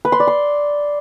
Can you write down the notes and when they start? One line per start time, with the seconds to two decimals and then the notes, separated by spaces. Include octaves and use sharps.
0.05 B4
0.12 C6
0.20 D5
0.27 C6